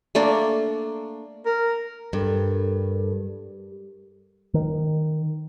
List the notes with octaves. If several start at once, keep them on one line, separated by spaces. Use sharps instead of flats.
A3 A#3 D4
A#4
G2 A4 A#4
D#3